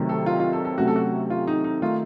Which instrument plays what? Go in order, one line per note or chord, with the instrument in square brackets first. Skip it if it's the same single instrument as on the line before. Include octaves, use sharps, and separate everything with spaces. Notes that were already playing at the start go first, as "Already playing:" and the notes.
Already playing: [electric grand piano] C3 D#3 F#3 A3
[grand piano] A4
F4
F4
A4
A4
[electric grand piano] C3 F#3 A3 C#4 [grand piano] F#4
[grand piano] A4
F#4
F4
D#4
D#4
[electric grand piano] D#3 A3 D#4 [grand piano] F4